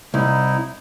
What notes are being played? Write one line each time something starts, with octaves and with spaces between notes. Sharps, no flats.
C2 D#4 E4